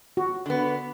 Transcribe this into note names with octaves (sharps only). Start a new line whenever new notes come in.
F#4
D3 B3